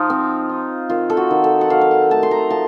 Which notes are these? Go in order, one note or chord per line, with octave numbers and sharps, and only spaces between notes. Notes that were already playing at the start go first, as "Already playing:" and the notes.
Already playing: F3 D#4 F4
C4
D#4
D#3 F4
A4
F#4
D#3
A4
F#5
F#3 F5
F5
F#5
A3 A5
C6
A#5
F3 A5